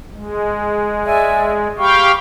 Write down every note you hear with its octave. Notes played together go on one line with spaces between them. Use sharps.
G#3
D5 E5 G#5
G4 F5 G5 B5 C#6